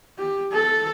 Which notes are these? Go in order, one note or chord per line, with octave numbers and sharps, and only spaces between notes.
G4
A4